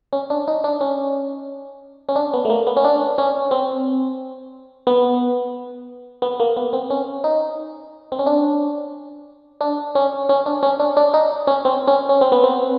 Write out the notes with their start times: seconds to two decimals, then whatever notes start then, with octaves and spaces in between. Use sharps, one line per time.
0.13 C#4
0.30 D4
0.48 D#4
0.64 D4
0.81 C#4
2.09 C#4
2.16 D4
2.34 B3
2.45 A3
2.50 A#3
2.67 B3
2.77 C#4
2.84 D4
3.18 C#4
3.51 C4
4.87 B3
6.22 B3
6.40 A#3
6.57 B3
6.73 C4
6.90 C#4
7.24 D#4
8.12 C4
8.19 C#4
8.26 D4
9.61 D4
9.95 C#4
10.29 C#4
10.46 D4
10.63 C#4
10.80 D4
10.97 D4
11.14 D#4
11.47 C#4
11.65 C4
11.88 C#4
12.09 C#4
12.21 C4
12.32 B3
12.44 C4